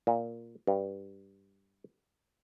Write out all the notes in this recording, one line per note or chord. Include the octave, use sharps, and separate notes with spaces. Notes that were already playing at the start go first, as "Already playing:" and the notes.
A#2
G2